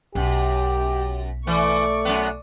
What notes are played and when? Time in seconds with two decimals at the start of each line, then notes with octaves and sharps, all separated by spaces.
0.15 B1 F#2 G4
1.47 E3 A3 D5 C#6
2.05 F#2 B3